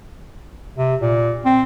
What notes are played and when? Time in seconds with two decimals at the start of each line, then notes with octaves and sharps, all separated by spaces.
0.77 C3
1.01 A#2
1.45 C4